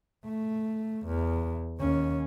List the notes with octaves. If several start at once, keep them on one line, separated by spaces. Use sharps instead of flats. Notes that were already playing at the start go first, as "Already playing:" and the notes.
A3
E2
D#2 C#4